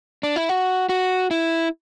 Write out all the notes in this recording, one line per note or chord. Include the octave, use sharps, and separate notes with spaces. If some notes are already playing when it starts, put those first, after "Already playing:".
D4
E4
F#4
F#4
E4